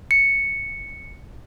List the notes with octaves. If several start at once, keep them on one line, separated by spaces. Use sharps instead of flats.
C#7